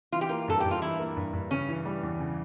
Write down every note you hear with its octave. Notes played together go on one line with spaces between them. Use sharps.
E3 F4
G4
A#3 F4
G2 A4
G2 G4
F4
E3 E4
A#3
G2
G2
C#3 C#4
E3
G3
E2
C#3